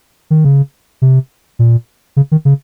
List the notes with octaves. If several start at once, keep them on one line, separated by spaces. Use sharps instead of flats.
D#3
C#3
C3
A#2
C#3
D#3
C#3